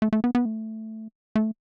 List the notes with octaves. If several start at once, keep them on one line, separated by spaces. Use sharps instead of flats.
A3
A3
B3
B3
A3
A3